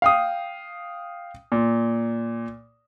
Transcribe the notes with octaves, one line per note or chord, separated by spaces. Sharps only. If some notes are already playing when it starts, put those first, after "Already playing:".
F5 G5 D#6
A#2